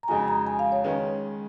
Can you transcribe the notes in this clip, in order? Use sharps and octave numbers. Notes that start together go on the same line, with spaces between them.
A#5
F2 C#3 G#3 D#4 F#4 G#5
A#5
G#5
F5
C#5
D#3 G#3 C#4 B4